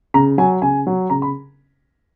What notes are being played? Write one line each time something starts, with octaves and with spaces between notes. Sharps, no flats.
C#3 A#5
F#3 G#5
C#3 G#5
F#3
C#3 A#5
B5